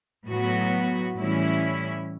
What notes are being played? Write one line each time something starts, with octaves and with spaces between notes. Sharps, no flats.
A2 F#3 B3 F#4
A2 E3 G3 C#4 E4